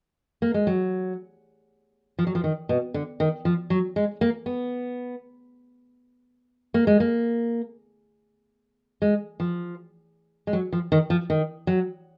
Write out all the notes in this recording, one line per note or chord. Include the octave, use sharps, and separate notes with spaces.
A#3
G#3
F#3
F3
F#3
F3
D#3
B2
D3
D#3
F3
F#3
G#3
A#3
B3
A#3
G#3
A#3
G#3
F3
G#3
F#3
F3
D#3
F3
D#3
F#3